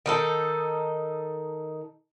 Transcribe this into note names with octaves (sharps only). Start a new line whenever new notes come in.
D#3 D#4 A4